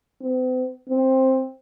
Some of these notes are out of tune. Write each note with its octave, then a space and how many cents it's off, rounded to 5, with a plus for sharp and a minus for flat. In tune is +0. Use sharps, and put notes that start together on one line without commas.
C4 -45
C4 +10